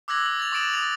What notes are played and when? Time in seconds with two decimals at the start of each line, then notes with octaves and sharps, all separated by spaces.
0.08 D6 E6 F#6 G#6 A#6 F#7
0.26 F#7
0.40 A6 F7
0.52 C#6 D#6 A6 D7 E7 F#7
0.74 D#6 A6 F7